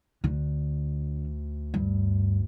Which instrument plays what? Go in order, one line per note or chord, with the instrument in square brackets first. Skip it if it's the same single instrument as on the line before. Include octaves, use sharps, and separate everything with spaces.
[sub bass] D2 [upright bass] D3
[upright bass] G2